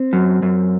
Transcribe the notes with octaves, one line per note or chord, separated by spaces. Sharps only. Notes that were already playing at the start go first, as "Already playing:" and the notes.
Already playing: C4
F#2
F#2